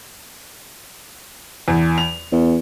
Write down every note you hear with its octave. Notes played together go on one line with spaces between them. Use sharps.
E2
F7
E2